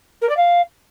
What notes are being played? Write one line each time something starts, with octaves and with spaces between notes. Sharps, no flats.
A#4
D5
F5